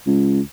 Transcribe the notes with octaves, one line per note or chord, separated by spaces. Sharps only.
C#2